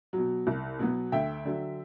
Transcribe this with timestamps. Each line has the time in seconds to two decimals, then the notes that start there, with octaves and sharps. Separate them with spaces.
0.13 F#3
0.18 B2
0.47 C2
0.79 B2 F#3 B3
1.12 D2 E5 G5
1.45 D3 F#3